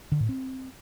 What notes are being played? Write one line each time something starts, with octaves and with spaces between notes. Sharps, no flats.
D3
A2
C4